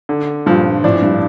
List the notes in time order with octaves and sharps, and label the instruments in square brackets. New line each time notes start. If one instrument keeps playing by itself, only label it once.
[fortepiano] D3
[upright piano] G2 A#2 [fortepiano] F3
[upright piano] F2 A2 [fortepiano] D4
[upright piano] G2